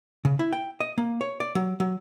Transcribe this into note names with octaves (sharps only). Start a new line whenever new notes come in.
C#3
E4
G5
D#5
A#3
C#5
D5
F#3
F#3